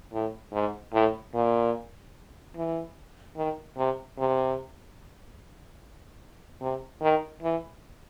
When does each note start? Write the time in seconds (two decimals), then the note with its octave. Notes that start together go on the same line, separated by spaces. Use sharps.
0.13 A2
0.53 G#2
0.93 A2
1.34 A#2
2.56 E3
3.36 D#3
3.77 C3
4.18 C3
6.61 C3
7.01 D#3
7.42 E3